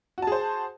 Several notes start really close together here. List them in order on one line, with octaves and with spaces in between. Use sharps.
F#4 A5 G#4 C5